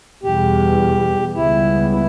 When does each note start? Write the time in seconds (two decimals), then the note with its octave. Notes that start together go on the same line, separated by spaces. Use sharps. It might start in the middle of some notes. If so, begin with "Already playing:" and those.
0.23 E2 B2 G3 G4
1.35 C#2 C#3 G3 B3 E4
1.92 E4